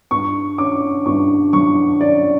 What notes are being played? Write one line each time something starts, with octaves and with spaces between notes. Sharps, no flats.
G2 C#6
C#4 D6
G2 C#6
F#3 C#6
C#4 D5